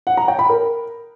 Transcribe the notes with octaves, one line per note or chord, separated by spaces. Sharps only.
F#5
A#5
G5
B5
A#4